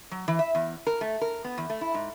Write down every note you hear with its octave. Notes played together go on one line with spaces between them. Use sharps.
F#3
E3
E5
E2
A#4
A3
A#4
B3
E2
A3
E4
G#2